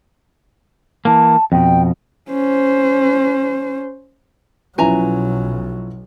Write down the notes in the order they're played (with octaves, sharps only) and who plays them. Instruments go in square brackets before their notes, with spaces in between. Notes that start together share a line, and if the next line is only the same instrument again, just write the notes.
[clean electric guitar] E3 A#3 [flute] A5
[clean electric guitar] F2 B2 [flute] G5
[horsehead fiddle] C#4 C5
[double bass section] B1 [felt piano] F3 C#4 E4 [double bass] F#3 [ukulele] B4 G#5 A#5